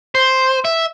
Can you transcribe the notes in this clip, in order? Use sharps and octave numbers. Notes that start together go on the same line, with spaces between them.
C5
E5